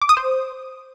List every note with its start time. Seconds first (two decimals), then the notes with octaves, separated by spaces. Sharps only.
0.02 D6
0.09 D#6
0.17 C5